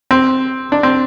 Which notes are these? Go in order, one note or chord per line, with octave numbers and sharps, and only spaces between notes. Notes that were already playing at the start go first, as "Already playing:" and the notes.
C4
D4
C4